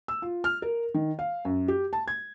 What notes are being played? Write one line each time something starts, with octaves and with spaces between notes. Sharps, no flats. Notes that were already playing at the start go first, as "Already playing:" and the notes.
E6
F4
F6
A#4
D#3
F5
F#2
G4
A5
G#6